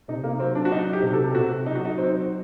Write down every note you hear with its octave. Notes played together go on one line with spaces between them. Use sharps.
C3 D#4
A#3
F#3 C4
D4
F#4
F#3 D#4
G4
C3
A4
C3 F#4
F#3 D#4
F#4
D#4
F#3 C4